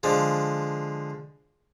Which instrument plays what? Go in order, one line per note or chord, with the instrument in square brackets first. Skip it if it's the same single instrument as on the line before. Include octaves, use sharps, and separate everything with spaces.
[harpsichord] D3 F3 G#3